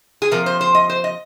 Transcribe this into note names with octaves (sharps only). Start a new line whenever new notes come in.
G#4
C3 F3 A#3 A#4
C5
C5
D#5
C5
D#5